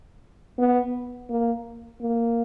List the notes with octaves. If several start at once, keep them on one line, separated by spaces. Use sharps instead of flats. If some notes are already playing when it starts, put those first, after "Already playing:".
B3
A#3
A#3